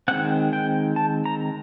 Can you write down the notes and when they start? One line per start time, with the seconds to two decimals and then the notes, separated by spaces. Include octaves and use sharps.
0.08 D#3 G#3 C4 F#5
0.53 G5
0.96 A5
1.26 A#5